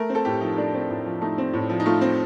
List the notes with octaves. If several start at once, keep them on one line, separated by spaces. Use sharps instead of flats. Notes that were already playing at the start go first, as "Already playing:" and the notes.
Already playing: A3 A#4
C4
A4
A2 G4
F3 D#4
A3 D4
C4
A2
F3
A3 D#4
C4
A2
F3
D#4
A3 F4
C4